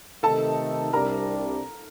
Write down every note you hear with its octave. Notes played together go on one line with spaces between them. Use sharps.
C3 D#3 A3 D#4 A4 A5
C2 C3 G3 D4 A#4 A#5